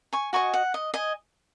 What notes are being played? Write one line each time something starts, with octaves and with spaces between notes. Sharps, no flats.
G#5 C#6
F#4 D#5 G#5 C#6
F#5
D#5
D#5 G#5